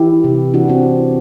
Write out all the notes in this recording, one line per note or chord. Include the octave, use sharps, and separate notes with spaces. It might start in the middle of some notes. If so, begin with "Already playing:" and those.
Already playing: E3 E4 G4
C3
E3 D4 F#4
C4 E4